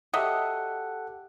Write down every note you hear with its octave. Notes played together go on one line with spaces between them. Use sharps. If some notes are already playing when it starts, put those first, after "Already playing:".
F#3 G4 A4 D#5 E5 F#5